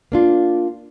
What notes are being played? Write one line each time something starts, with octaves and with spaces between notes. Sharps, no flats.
A#3 D4 F4